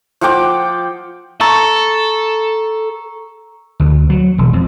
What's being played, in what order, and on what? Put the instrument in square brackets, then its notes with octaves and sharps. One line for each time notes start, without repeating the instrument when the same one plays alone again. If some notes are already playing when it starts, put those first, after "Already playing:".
[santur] F3 F#5 G5 D6
[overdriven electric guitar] A4 [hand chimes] A#5 C#6 E6
[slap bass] D2
F#3
E1
F2